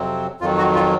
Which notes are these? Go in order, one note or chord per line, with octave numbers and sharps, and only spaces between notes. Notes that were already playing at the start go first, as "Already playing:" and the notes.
Already playing: F2 C3 F#3 C4
F2 D#3 F#3 F4
F#4
F4